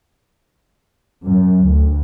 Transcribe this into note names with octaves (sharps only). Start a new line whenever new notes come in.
F#2
D2